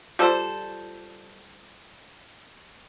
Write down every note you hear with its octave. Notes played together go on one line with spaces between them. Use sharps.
G3 F4 A4 C5 D5